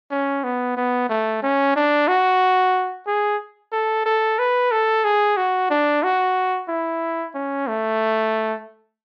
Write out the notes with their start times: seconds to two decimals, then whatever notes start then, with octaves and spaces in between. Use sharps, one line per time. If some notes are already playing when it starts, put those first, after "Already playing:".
0.11 C#4
0.44 B3
0.77 B3
1.10 A3
1.43 C#4
1.76 D4
2.08 F#4
3.07 G#4
3.73 A4
4.06 A4
4.39 B4
4.72 A4
5.05 G#4
5.37 F#4
5.70 D4
6.03 F#4
6.69 E4
7.35 C#4
7.68 A3